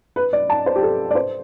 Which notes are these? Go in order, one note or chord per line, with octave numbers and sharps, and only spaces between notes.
B4
D5
A5
C5
G4
A4
D5
C5